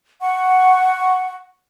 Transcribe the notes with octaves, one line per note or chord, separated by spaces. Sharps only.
F#5 C#6